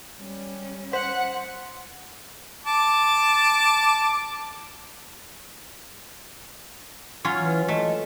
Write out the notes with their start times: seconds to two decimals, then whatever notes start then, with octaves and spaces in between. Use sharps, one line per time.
0.18 G3 C#4
0.93 C5 F#5 C6 B6
2.66 A5 D6
7.25 F#3 C#4 F4
7.40 E3
7.68 A3 D#5